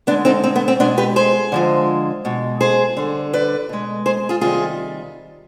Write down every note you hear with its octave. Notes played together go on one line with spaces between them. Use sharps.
D3 G#3 B3 D4
C4 D#4
C4
B3
C4
B2 G#3 B3 D4
G4 B4
G#4 C5
D3 F3 G#3
B2 G#3
G#4 C5
D3 G3
B4 D5
B2 G#3
G#4 C5
F4 G#4
C3 D#3 G3 F4 G#4